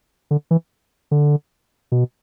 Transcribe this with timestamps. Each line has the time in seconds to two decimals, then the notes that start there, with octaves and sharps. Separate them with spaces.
0.31 D3
0.51 E3
1.11 D3
1.92 B2